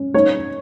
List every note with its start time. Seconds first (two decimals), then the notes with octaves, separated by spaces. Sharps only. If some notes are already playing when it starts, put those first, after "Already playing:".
Already playing: C#4
0.14 D#4 C#5